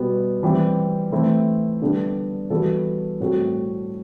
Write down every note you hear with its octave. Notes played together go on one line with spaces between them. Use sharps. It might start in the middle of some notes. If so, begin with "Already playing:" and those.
Already playing: B2 G3 B3
E3 G3 C4 G4
E3 A3 C4 E4
D3 G3 B3 D4 A4
E3 G3 B3 F#4 A4
A2 G3 C4 F#4 A4